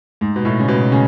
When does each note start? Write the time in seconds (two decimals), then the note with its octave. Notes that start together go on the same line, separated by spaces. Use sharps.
0.21 G#2
0.36 B2
0.45 A2
0.60 C#3
0.68 B2
0.92 C#3